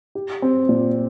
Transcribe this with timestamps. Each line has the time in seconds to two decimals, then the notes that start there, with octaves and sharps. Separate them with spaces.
0.15 G4
0.42 C4
0.69 A#2